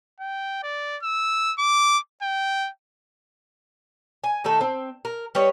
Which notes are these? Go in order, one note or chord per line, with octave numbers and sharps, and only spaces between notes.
G5
D5
E6
D6
G5
G#5
D#3 A3 D#4 A4
C4
A#4
G3 B4 C#5 D#5